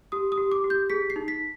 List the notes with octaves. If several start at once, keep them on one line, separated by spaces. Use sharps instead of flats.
G4 D#6
D#6
G4
D6
G4
G6
G#4 B6
C7
D#4
B6